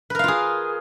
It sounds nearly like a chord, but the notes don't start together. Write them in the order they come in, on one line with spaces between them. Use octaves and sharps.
B4 A#4 F5 F4 G#4